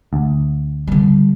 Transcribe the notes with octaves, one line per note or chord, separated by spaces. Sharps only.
D2
D3 G3